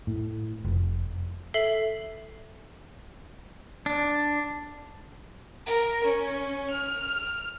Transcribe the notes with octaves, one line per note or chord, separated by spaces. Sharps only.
A2
F1
A4 E5 C7 F#7 G7
D4
A#4
C#4
F6